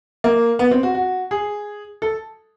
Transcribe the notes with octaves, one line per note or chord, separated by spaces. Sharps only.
A#3
B3
C4
F#4
F#4
G#4
A4